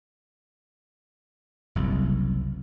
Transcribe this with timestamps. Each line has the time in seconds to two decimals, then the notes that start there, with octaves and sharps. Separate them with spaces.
1.75 F#1 C2